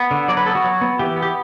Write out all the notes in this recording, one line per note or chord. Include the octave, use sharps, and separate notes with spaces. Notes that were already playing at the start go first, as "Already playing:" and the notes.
Already playing: B3
D3
F#3 D5
B4
B3 A4
F#4
F#3
B3
E3 G4
B3
G4